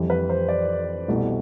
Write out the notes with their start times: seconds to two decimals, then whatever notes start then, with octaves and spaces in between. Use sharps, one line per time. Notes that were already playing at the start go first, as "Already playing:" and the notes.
Already playing: F2 E3 G3
0.10 B4
0.29 C5
0.49 D5
1.08 C2 B2 A3